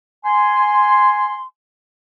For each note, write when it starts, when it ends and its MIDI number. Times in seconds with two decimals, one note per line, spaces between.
0.25 1.42 80
0.25 1.42 84